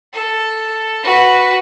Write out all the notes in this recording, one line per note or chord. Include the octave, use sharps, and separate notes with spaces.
A4
F#4 B4